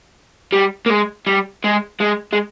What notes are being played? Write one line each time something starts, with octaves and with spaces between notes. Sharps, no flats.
G3
A#3
G#3
G3
G#3
G#3
G#3